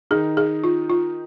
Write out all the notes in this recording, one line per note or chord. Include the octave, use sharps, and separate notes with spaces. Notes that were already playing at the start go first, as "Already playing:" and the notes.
D#3 D#4 G#4
G#4
F4
F4